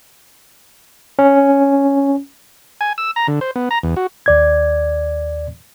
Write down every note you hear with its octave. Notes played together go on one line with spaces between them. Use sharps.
C#4
G#5
E6
A#5
D3
C5
B3
A#5
E2
F#4
D#2 D5 G#6